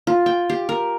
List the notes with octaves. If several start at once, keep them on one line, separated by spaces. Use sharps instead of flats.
F4
G5
G4
A#4